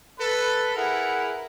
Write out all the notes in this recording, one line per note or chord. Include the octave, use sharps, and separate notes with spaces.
A4 B4
E4 G#4 A#4 B4 F#5